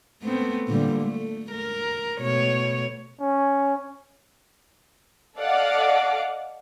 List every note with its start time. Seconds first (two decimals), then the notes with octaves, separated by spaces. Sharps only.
0.22 A3 B3 C4
0.68 A#2 D3 G3
1.02 A3
1.51 A#4
2.20 B2 A3 C#5
3.20 C#4
5.39 A4 D5 D#5 F5 F#5 D6